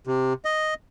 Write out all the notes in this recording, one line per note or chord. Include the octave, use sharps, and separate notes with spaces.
C3
D#5